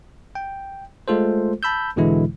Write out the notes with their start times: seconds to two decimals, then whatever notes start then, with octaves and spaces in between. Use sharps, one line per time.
0.35 G5
1.08 G#3 A3 F4 A4 C5
1.63 A5 B5 E6 G6
1.96 E2 B2 D3 E3 G#3 E4